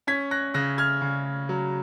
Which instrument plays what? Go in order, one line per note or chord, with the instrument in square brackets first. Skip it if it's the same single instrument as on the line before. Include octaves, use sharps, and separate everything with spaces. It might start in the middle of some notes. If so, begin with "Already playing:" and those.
[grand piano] C#4 G#6 B6
F#6 A#6
C#3 F#6 A#6
F6 G#6
C#3
F#3